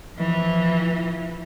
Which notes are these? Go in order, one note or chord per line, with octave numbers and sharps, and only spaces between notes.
E3 F3